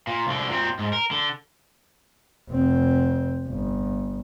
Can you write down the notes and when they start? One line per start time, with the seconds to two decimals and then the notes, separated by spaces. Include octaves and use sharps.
0.07 A#2
0.27 C2 D3
0.49 A#2 C4
0.79 G#2
0.93 A#4
1.11 D3
2.50 F1 C4
3.47 G1